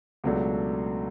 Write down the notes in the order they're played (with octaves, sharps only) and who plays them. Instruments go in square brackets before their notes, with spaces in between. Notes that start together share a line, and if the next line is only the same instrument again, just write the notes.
[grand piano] C#2 B2 F#3 A3 D4